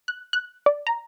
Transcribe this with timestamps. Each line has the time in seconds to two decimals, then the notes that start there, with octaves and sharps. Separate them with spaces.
0.08 F#6
0.33 F#6
0.66 D5
0.87 A#5